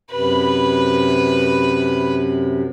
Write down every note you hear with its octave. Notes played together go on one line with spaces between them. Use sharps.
F#2 C3 B4 B5